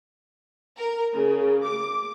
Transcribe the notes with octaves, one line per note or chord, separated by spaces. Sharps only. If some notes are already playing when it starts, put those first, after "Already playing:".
A#4
C#3
D6